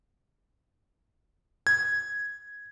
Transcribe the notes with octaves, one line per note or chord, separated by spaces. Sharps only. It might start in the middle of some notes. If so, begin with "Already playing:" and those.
G#6